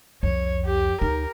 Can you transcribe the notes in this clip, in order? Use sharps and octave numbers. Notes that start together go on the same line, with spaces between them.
C2 F2 C#5
G4
D2 D#4 A#4